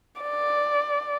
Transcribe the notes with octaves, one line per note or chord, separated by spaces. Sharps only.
D5